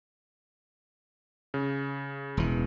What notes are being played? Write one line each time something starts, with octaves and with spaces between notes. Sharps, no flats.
C#3
E1 E3